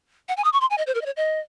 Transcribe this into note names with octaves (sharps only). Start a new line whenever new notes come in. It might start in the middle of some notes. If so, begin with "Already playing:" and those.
F#5
G#5
D#6
C#6
C6
G#5
D#5
C5
A#4
D#5
C#5
D#5